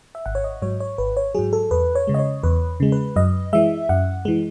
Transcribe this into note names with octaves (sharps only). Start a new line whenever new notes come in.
E5
G#1 F#5
C#5
D#5
G#2 F#3 C#5
C#5
G#1 B4
C#5
G#2 F#3 G#4
A4
E2 B4
C#5
C#3 G#3
D#5
C#5
E2 B4
C#3 G#3
B4
F#2 D#5
E3 G#3 E5
F#2 F#5
E3 G#3